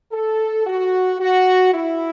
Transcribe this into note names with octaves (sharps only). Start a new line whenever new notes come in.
A4
F#4
F#4
E4